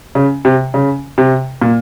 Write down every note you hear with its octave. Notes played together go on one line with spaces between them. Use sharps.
C#3
C3
C#3
C3
A#2